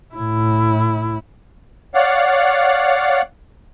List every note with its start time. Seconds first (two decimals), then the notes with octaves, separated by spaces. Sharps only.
0.14 A2 E4
1.94 C#5 D5 F5 F#5